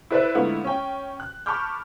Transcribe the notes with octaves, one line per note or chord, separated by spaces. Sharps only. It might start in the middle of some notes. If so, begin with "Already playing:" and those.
E4 A4 B4 C5 D5 E5
G#2 D3 A3 B3 E4 F4
C#4 G5
F#6
A5 B5 C#6 D6 F6 G6